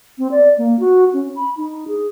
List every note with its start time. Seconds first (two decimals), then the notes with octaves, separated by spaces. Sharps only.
0.18 C4
0.31 D5
0.58 A#3
0.80 F#4
1.13 C#4
1.36 B5
1.57 D#4
1.88 G#4